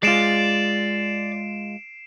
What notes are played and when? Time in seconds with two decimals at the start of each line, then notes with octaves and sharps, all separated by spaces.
0.03 G#3 F4 D5 C7 D7 E7